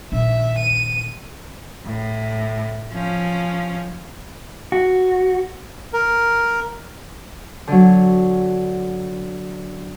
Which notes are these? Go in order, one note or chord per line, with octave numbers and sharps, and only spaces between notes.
A#1 D#3 E5
D#7
A2
F3 C#4
F#4
A#4
D3 F#3